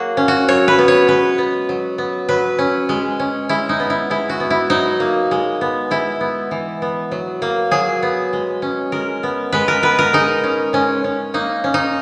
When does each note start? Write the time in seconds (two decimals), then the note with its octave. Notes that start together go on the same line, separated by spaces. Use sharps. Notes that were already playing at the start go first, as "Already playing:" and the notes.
Already playing: F#3 A#3 F#4 G#4 A#4
0.17 C#4
0.28 F#4
0.48 F#3 C#5
0.68 B4
0.79 B3
0.88 C#5
1.08 G#3 B4
1.38 B3
1.69 F#3
1.98 B3
2.29 F#3 B4
2.59 C#4
2.89 G#3
3.20 C#4
3.49 G#3 E4
3.69 D#4
3.80 B3
3.90 E4
4.10 G#3 E4
4.29 F#4
4.40 B3
4.50 E4
4.70 F#3 D#4
5.00 A#3
5.31 G#3
5.61 B3
5.91 G#3 E4
6.21 B3
6.51 E3
6.82 B3
7.12 F#3
7.42 A#3
7.71 F#3 G#4
8.02 B3
8.33 G#3
8.62 C#4
8.92 G#3 A#4
9.23 B3
9.52 G#3 B4
9.68 A#4
9.83 B3 B4
9.99 A#4
10.13 G#3 D#4
10.44 C#4
10.73 G#3 C#4
11.04 C#4
11.34 A#3 D#4
11.64 C#4
11.74 D#4